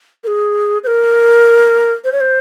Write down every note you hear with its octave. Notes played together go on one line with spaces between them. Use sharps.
A#4
G#4
C5
A#4
C5
C#5
C5